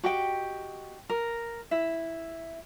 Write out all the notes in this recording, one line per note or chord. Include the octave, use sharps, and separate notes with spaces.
F#4 G4 D#5 G5
A#4
E4 E5